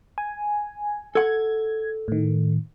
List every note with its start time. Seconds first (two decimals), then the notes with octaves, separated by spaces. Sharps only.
0.18 G#5
1.15 A4 F#5 G#6
2.08 A2 D#3